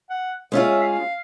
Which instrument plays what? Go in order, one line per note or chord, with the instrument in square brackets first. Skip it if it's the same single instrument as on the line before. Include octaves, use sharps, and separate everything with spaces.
[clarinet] F#5
[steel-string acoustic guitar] G#3 C#4 F4 G#4 [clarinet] E5
[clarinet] F5